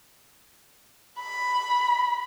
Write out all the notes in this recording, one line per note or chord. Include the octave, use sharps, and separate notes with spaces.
B5